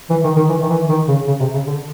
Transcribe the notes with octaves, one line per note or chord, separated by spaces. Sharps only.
E3
D#3
D#3
E3
D#3
E3
D#3
C#3
C#3
C3
C#3
D3